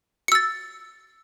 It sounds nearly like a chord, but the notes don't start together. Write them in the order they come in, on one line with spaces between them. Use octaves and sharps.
C#7 E6 A6